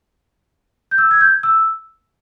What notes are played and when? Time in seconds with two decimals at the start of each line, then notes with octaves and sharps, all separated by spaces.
0.91 G6
0.98 E6
1.11 G#6
1.21 G6
1.43 E6